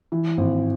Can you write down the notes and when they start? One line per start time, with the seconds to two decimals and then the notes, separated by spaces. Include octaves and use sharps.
0.12 E3
0.37 G#1